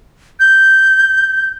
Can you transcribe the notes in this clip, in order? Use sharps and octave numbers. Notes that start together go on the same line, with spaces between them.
G6